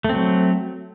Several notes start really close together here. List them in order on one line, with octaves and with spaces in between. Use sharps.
A3 C4 F#3